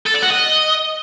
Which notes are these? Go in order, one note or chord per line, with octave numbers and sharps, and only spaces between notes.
A4
D5
F#4
D#5